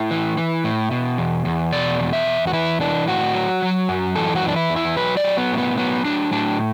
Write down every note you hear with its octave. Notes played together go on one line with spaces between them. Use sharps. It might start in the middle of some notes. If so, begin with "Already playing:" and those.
Already playing: A2 E4
E3
E3
A2
B2
E2
E2
B2 D5
E2
E5
E2
F#4
E3 E4
E3 D4
A2 F#4
F#3
F#3
F#2
E3 A4
F#4
E3 D4
E4
E2
E4
F#3 B4
D5
F#3
B3
A2
B3
F#3 B3
F#3 D4
A2 D4